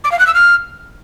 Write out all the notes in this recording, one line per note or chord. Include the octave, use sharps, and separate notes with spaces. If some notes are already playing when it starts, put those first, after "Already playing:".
D6
F5
F#6
E6
F6